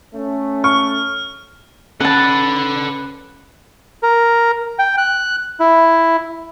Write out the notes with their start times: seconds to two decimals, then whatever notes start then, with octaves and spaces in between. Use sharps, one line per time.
0.15 A3 C#4
0.64 C#6 F6
2.00 C#4 A4 B4 F#5 A5 F#6
4.03 A#4
4.79 G5
4.98 F#6
5.60 E4